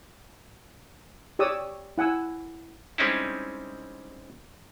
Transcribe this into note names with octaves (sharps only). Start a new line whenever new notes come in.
G4 C#5 D5 D#6 E6
E4 F#5 G#5 E6
G3 G#3 C4 C#4 D#4 E4